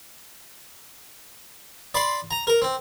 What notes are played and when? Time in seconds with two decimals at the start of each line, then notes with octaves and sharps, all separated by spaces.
1.95 D5 B5 C6
2.31 A#5
2.47 A#4
2.62 C4